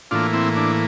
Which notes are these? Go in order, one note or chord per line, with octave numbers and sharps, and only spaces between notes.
A2 E3 A#3 D4 F4
C4 E4
D4